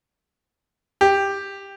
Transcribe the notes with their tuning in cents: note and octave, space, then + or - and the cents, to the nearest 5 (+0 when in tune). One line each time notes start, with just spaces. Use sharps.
G4 +10